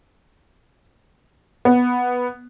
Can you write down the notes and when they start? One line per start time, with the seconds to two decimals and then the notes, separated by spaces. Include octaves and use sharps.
1.65 B3